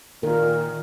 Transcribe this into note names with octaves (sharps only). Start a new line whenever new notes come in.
A#2 D#3 A#4